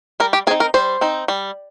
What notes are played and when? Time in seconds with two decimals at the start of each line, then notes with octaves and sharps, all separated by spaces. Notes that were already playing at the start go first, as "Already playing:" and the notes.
0.20 G3 A#4
0.33 G4
0.47 C4 G#4
0.51 D#4
0.60 A#4
0.74 G3 C5
1.01 C4 D#4
1.28 G3